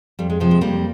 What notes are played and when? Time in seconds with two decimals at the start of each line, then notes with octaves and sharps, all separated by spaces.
0.19 F2 G3
0.30 G#3
0.40 C3 F3 G#3
0.51 G#3
0.61 F2 G3 A#3